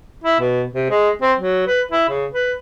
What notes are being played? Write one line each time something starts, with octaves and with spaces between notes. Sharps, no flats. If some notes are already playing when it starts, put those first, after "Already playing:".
E4
B2
C3
G#3
C4
F#3
B4
E4
C#3
B4